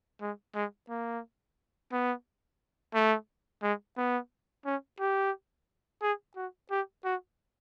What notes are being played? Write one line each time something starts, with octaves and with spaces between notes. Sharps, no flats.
G#3
G#3
A#3
B3
A3
G#3
B3
C#4
G4
G#4
F#4
G4
F#4